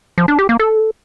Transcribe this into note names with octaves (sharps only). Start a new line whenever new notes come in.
F3
D4
G4
A#3
A4